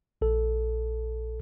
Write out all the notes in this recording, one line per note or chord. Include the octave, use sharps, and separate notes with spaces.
A#1 A4